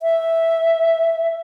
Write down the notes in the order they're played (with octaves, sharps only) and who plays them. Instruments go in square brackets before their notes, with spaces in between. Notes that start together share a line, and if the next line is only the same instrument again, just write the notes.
[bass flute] E5